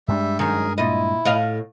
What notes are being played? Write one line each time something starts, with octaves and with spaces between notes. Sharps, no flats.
G2 G3 G#3 D4 E5
F#2 D#3 G#4 A#4 G#5
A#2 E4 D#5
A2 D#5 F5